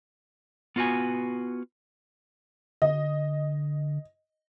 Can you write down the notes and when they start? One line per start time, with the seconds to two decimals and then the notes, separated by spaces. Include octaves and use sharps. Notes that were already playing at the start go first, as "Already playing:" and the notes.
0.76 B3 F4 F#4 B4 G#5
2.82 D3 D#5